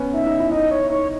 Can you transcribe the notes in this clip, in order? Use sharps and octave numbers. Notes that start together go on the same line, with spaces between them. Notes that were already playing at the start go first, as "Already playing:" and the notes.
Already playing: B3 C#4
D#4 E5
D#4
E4
D#4 D#5
C#5
D#4 C#5